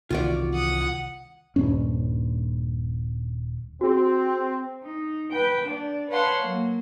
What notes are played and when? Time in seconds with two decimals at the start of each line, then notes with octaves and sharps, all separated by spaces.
0.10 C2 D#3 E3 F4 F#4 D5
0.53 F#5 D#6
1.56 D#1 G#1 G2 C#4
3.81 C4 F#4 G#4
4.83 D#4
5.30 B4 G5
5.65 D4 D5
6.09 B4 C#5 F5 F#5 A5 C6
6.41 F#3 A#3